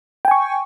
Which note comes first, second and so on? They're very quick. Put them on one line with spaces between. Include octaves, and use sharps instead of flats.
G5 G#5 C#6